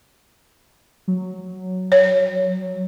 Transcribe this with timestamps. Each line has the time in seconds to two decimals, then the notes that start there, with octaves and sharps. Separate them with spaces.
1.08 F#3
1.92 C#5